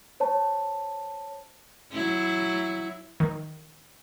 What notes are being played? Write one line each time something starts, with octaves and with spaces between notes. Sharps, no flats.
C5 C#5 A5
F#3 E4
D#3